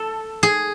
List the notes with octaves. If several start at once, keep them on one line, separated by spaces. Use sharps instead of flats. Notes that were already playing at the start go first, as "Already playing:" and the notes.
Already playing: A4
G#4